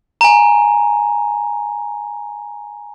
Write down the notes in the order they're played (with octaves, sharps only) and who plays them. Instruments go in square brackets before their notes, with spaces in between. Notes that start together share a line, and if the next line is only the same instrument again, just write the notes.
[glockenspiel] G#5 A#5